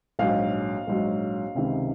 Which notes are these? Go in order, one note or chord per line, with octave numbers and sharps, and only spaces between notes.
A#1 G#2 F#3 F5
A#1 G#2 F#3
C#2 C3 D#3